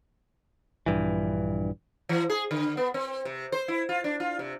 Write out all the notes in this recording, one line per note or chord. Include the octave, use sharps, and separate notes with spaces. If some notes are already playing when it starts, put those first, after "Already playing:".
A#1 G2 E3
E3
G#4
D3
B3
C4
C3
C5
E4
F4
D4
F4
C3